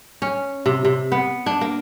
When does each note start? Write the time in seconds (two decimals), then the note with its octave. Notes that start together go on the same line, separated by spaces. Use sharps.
0.22 C#4
0.66 C3
0.85 C3
1.12 B3
1.46 D4
1.61 A#3